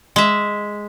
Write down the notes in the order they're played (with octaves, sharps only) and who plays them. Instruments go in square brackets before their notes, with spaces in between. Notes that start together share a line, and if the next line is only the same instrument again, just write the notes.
[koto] G#3 E5